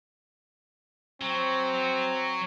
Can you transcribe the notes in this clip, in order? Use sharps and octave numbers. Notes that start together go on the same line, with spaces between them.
F#3 C4